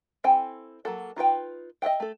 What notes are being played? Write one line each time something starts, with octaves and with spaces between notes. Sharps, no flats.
C4 E4 A4 G5 G#5
F#3 A#3 F#4 A4
D#4 F4 B4 G5
D#5 E5 F#5 G5
A3 A4